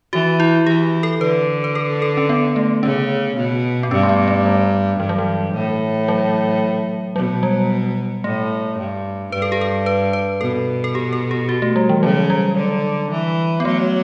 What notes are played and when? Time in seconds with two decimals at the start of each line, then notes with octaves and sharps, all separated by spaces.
0.13 E3 F#4
0.40 E4
0.67 E3 G4
1.03 A4
1.21 D3 B4
1.64 B4
1.75 A4
2.02 A4
2.17 C#4
2.29 B3
2.56 A3
2.83 C#3 C#4
3.37 B2
3.83 B3
3.91 G2 C#4
4.03 A3
4.09 B3
4.28 A3
4.46 G3
5.00 G2 E3
5.09 F#3
5.18 E3
5.54 A2
6.08 F#3
7.16 B2 F#3
7.43 G3
8.24 A2 A3
8.79 G2
9.32 G2 B4
9.42 A4
9.52 G4
9.61 A4
9.86 B4
10.13 B4
10.41 B2 A4
10.84 A4
10.95 G4
11.13 A4
11.31 G4
11.49 F#4
11.62 A3
11.76 G3
11.89 E3
12.03 C#3 F#3
12.30 G3
12.57 D3
13.11 E3
13.60 B3
13.65 F#3 A3